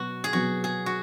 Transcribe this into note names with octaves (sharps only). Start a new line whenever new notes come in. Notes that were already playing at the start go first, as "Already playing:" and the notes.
Already playing: B2 F#3 F#4
G#4
B2 F#3 B3 F#4
G#4
F#4